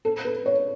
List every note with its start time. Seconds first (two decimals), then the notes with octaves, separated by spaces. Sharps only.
0.05 A4
0.25 B4
0.46 C#5